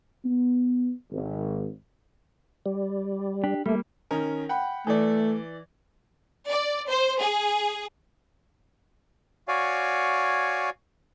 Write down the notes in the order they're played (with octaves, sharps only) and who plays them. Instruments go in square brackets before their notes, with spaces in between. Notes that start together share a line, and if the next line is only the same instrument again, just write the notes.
[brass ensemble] B3
G#1
[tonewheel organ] G3
[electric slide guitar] D4 G4
[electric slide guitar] G3 A#3 [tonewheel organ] A3
[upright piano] D#3 C#4 A#4
F#5 G5 B5
[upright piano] E3 D5 [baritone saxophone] A3
[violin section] D5
C5
G#4
[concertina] F#4 C#5 D5 F5 G#5